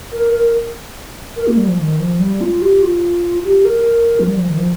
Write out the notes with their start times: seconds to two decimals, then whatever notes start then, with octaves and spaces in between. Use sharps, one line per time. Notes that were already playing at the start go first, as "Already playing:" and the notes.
0.13 A#4
0.34 A#4
1.36 A#4
1.47 A#3
1.57 G3
1.67 F3
1.78 D#3
2.00 F3
2.19 G3
2.41 F4
2.62 G4
2.83 F4
3.44 G4
3.65 A#4
4.20 F3
4.27 G3
4.37 F3
4.48 D#3
4.58 F3